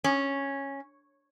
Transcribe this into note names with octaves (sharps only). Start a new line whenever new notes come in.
C#4